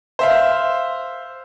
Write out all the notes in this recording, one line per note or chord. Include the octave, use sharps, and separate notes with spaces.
C5 E5 F5